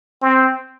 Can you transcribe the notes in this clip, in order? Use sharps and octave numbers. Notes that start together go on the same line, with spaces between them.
C4